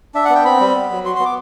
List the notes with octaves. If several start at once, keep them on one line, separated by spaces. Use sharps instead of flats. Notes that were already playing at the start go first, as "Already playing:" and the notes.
D4 E5
F#5
B3
G5
C4 B5
G3
B3
F#3
F#4 C6
B3 C6
D6